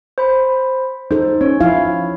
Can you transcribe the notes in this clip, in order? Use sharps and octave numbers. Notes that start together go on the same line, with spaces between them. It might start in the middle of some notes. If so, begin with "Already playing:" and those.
C5 B5
D#4 A4 C5
C#4 C#5
F3 E4 F5